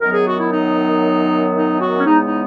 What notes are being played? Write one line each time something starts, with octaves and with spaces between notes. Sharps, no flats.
F#2 D#3 F#3 B3 A#4
G#4
F#4
E4
D#4
D#4
F#4
C#4
E2 C#3 G#3 B3 D#4
D#4